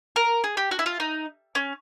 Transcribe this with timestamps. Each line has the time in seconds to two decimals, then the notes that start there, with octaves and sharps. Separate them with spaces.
0.16 A#4
0.44 G#4
0.57 G4
0.71 F#4
0.79 E4
0.86 F4
1.00 D#4
1.55 C#4